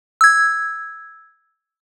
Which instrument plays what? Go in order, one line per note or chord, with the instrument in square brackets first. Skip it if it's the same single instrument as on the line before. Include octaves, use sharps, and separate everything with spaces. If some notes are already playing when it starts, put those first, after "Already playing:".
[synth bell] E6 G#6